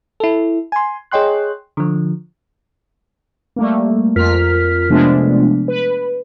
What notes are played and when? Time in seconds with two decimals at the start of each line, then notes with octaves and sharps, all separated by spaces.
0.20 E4 A4
0.72 G#5 C6
1.11 G#4 C#5 D#5 G5 C6 F#6
1.77 D3 F3
3.56 G3 A3 A#3
4.16 F2 F4 A#4 F6 B6
4.89 C3 F3 G#3 A3 B3 D4
5.68 B4